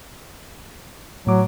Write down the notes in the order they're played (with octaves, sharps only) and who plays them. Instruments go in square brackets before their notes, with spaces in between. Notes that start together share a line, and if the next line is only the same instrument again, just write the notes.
[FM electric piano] A2 D6 [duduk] F#3